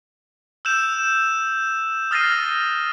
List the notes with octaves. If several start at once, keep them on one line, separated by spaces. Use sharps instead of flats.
E6 F#6 G6 E7 F7
D#6 F6 A6 A#6 C7 D#7